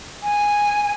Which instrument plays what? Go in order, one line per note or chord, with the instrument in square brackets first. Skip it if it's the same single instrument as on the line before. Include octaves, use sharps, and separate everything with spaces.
[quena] G#5